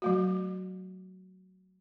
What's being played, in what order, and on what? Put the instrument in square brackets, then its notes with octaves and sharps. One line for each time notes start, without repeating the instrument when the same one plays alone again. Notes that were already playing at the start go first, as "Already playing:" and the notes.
[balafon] F#3 A3 F#4